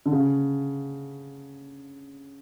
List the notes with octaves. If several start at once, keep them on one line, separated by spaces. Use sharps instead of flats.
D3
C#3